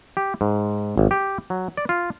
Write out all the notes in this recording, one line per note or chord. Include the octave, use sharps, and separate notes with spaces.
G4
G#2
G#1
G4
F#3
D5
F4